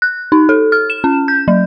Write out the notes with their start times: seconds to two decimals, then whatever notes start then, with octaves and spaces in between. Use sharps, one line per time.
0.02 F#6
0.32 D#4
0.49 A4
0.72 F6
0.90 E7
1.04 C#4
1.28 G6
1.48 F#3